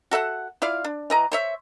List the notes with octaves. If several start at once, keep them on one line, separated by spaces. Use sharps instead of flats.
F#4 A4 E5 F#5
E4 F4 D5 F5
D4
E3 D#5 A#5
C5 C#5 E5